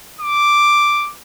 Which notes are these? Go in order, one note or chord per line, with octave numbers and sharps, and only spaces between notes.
D6